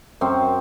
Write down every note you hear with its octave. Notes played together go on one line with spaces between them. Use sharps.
F#2 C4